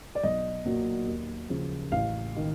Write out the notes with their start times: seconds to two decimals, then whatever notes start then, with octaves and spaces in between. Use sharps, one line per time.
0.15 D5
0.23 B1 D#5
0.65 A#2 F#3 A#3
1.08 D#2
1.49 C#3 F3
1.92 A1 F5
2.36 D#3